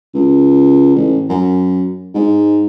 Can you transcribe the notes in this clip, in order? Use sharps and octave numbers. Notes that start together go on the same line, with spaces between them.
C#2
A1
F#2
G#2